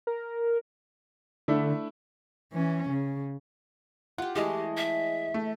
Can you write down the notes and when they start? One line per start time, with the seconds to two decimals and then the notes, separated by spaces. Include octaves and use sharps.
0.07 A#4
1.48 D3 A3 D4 E4
2.53 E3 C#4
2.89 C#3
4.18 F4 G4 F#5
4.36 E3 G#3 A3 G4 G#4 D#5
4.77 E5
5.34 A3